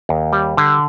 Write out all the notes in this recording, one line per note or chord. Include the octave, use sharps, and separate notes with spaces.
D#2
G3
D3